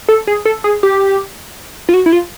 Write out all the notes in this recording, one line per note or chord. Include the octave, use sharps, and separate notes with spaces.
A4
G#4
A4
G#4
G4
F4
F#4
E4
F4